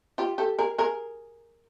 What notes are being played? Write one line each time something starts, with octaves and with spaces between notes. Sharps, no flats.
F4 G4
G4 A4
G#4 A#4
G#4 A#4